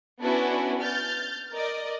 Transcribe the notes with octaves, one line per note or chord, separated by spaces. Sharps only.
B3 C#4 D4 E4 F#4 B4
F6 G6 A6
A#4 D5 D#5